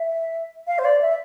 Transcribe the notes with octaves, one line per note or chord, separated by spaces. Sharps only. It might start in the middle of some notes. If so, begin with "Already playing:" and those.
Already playing: E5
F5
C5
D5
E5